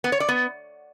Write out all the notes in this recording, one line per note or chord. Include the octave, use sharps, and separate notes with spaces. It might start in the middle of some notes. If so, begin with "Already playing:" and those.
B3
C#5
D5
B3